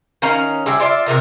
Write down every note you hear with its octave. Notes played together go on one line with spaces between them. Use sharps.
D#3 C#4 F5 A#5
G3 E4 G#4 G5
F4 D5 E5
C3 D#3 A#4 A#5